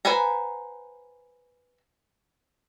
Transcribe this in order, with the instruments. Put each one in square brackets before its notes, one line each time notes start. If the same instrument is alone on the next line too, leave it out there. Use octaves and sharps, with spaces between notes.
[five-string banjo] B4 C5 F#5 G#5 A#5